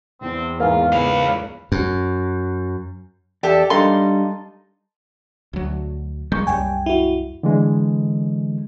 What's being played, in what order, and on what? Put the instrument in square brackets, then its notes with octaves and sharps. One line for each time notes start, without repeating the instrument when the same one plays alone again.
[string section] E2 [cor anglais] C4
[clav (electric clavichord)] G#2 E3 A#3 [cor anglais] F4
[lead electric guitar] C#2 F5 [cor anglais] B4
[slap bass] F#2
[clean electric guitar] E2 D5 [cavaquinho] G4 A4 E5
[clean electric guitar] G3 D4 F5 [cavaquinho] D#4 A4 C6
[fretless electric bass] D2 F#3
[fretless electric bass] G3 G#3 A#3 [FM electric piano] C#6 G6
[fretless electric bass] C2 F#2 G3 [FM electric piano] G5 G#5
[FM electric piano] E4 F#4
[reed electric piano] D3 E3 G#3